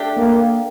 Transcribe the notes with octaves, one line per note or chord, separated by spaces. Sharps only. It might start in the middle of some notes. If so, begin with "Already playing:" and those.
Already playing: A3 D4 G4
A#3